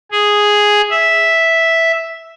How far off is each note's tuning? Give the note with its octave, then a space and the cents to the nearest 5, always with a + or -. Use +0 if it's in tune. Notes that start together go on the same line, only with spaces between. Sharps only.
G#4 +0
E5 -5